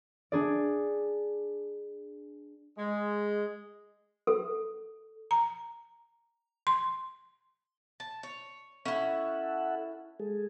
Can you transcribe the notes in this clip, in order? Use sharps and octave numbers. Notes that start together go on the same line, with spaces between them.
D4 G#4 D5
G#3
A4
A#5
C6
A5
C#5
C#4 E4 A4 E5 F#5
G#3 G#4 A4